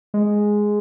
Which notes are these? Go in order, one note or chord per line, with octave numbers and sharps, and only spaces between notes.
G#3